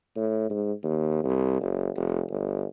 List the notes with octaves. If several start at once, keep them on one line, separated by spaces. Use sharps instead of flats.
A2
G#2
D#2
C2
F#1
F1
G1